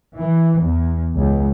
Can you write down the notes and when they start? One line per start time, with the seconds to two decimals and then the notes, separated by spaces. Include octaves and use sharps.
0.17 E3
0.62 E2
1.16 C#2